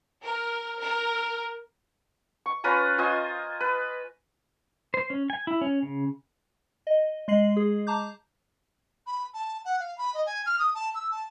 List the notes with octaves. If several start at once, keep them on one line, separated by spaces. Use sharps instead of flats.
A#4
A#4
C#6
C#4 F4 B4 A#5
F4 C5 D#5 G#5
B4
C5
C#4
G#5
E4
C#4
C#3
D#5
G#3 D#5 C7 F#7
G#4
A5 A#5 D6 G6
B5
A5
F#5
F5
B5
D#5
G#5
F6
D#6
A5
E6
A5